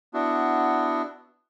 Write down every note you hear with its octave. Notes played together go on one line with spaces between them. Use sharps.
B3 D4 E4 F#4